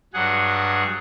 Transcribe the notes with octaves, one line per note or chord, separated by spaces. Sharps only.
G2 F#3 G#4 F#5